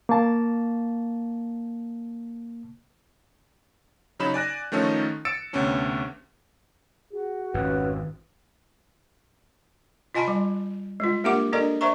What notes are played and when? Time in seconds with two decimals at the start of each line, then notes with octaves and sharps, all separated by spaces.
0.09 A#3 A5
4.19 C#3 F#3 D#4 B5 E7
4.34 D5 G#5 F#6 A#6
4.72 D#3 F3 A3 C#4 D#4 A4
5.25 E6 A6 C#7 D7 E7
5.53 D2 C3 B3 C#4 D4
7.13 F#4 G#4
7.54 G#1 F2 C#4 B4
10.15 F4 D#5 G#5 A5 B5 C6
10.28 G3
11.00 G#3 F4
11.24 A#3 D4 G4 A#4 F#5 D6
11.53 D4 A4 A#4 D5 D#5 A#5
11.81 C5 D5 E5 A#5 C#6